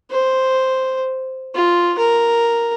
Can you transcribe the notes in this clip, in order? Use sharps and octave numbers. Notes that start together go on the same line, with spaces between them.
C5
F4
A#4